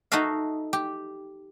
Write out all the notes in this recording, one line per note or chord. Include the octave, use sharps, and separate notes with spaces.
D#4 F#4 A4 E5 F5
G4